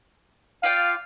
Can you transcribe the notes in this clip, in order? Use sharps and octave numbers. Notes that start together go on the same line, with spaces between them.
F4 D5 F5 G5